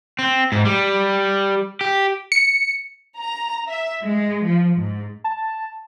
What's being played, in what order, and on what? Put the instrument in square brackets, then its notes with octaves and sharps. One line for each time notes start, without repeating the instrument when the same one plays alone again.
[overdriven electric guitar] C4
G#2
G3
G4
[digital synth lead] C#7
[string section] A#5
E5
G#3
F3
G#2
[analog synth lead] A5